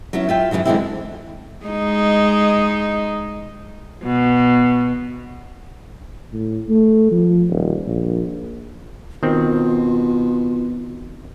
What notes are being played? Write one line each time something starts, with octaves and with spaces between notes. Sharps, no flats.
F#3 B3 C#4 E4
F4 E5 G5
F#2 A2 C#3 E3 F#3
D3 E3 F3 G#3 C4 E4
G#3 D#4
B2
A2
A3
F3
D#1
A#1
B2 D#3 C4 F4